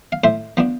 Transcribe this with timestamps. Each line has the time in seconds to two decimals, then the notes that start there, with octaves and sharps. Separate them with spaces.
0.12 F5
0.24 A2 C5 E5
0.57 F3 B3 D4